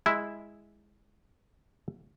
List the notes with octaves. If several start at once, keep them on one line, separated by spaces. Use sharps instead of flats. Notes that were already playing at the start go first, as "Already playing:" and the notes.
G#3 E4 E5